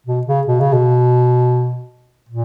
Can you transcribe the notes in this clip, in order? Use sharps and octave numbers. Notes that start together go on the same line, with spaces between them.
B2
C#3
B2
C#3
B2
A#2